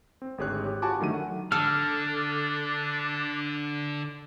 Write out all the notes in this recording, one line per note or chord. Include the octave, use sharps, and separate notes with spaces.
C4
G#1 D2 G4 G#4 C#5 F#6
G4
F4 F#4 G#5 A5 B5 D6
D3 D#3 F#3 A3 D#7
F#5
D3 D4 A4 F6